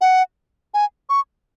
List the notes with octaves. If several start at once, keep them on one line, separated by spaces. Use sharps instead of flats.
F#5
G#5
C#6